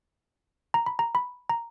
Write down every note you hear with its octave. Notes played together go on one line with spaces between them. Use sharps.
A#5
B5
A#5
B5
A#5